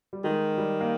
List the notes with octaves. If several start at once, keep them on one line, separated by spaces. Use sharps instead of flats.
G3
D#3 G#3
G3
A#3